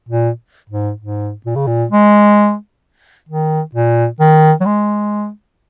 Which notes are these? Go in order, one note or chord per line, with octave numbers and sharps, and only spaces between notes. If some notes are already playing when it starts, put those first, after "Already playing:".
A#2
G#2
G#2
A#2
C#3
A#2
G#3
D#3
A#2
D#3
F#3
G#3